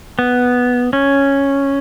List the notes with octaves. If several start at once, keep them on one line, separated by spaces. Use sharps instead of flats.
B3
C#4